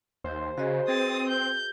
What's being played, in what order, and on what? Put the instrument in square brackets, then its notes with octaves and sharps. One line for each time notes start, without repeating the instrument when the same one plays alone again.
[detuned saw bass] D#2 [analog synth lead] C5
[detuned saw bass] C#3 [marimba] F#4 G#4 D#5
[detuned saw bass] C4 [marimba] G#4 B4 [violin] D#6 A6
[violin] G6